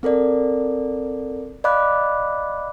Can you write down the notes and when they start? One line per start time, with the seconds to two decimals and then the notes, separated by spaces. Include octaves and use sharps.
0.03 C4 A4 A#4 D5
1.64 D5 D#5 F5 B5 D6 F#6